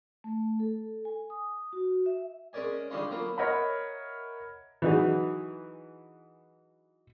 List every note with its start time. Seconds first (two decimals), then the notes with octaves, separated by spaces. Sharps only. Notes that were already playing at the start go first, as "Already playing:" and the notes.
0.24 A3
0.60 A4
1.05 G#5
1.30 D#6
1.73 F#4
2.06 E5
2.53 G#3 C#4 A#4 D5 G#5
2.90 D3 G3 G#3 C#4 D#4 F4
3.11 F#3 A#3 B3 F4
3.38 A#4 C#5 D#5 E5 F#5 B5
4.82 E3 F#3 D#4 F#4 G#4